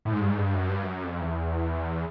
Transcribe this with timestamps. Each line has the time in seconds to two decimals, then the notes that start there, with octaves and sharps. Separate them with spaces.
0.05 A2
0.13 G#2
0.21 G2
0.28 G#2
0.38 G2
0.54 F#2
0.69 G2
0.82 F#2
1.04 F2
1.21 E2